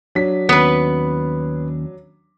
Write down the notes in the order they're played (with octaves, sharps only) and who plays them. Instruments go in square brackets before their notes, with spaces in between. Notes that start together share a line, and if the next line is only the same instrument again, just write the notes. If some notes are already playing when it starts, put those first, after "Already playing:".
[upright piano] F#3 D4 B6
[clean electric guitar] D#2 C#4 [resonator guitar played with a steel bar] B3 B4